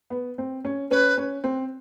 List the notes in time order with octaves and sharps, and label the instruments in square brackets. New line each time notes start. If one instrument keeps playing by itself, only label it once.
[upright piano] B3
C4
C#4
[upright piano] C#4 [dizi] B4
[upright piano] C#4
C4